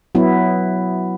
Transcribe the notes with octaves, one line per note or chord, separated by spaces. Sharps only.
F#3 B3 E4